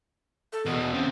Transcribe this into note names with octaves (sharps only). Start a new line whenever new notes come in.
A4
E2 B2 B3
C#3 C4